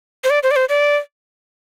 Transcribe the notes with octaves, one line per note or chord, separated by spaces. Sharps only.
C5
D5
C5
D5
C5
D5